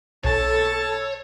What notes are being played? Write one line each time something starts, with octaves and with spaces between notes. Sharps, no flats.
B1 A4 C#5 A5